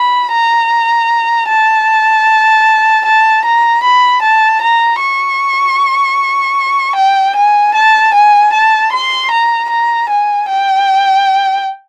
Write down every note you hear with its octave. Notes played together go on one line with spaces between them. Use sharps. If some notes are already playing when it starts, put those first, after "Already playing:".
Already playing: B5
A#5
A5
A5
A#5
B5
A5
A#5
C#6
G5
G#5
A5
G#5
A5
C6
A#5
A#5
G#5
G5